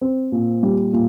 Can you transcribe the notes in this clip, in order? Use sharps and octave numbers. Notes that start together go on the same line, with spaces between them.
C4
A#2
G3
A#2